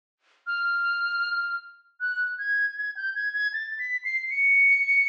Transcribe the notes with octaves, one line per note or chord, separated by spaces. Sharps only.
F6
F#6
G#6
G#6
G6
G#6
G#6
A6
B6
C7
C#7